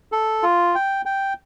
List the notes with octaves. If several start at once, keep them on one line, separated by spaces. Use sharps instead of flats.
A4
F4
G5
G5